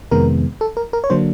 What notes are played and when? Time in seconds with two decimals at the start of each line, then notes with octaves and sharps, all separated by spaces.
0.11 F2 C3 D#3 G#3 B3 A#4
0.61 A4
0.77 A#4
0.93 A#4
1.04 C#5
1.10 D3 F#3 A#3 D4 C5